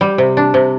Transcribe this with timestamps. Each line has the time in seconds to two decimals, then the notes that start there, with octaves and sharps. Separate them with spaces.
0.01 G3
0.18 C3
0.37 D4
0.54 C3